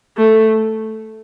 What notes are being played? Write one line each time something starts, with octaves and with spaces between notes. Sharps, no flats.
A3